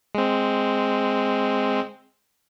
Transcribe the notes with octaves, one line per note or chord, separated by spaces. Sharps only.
G#3 C4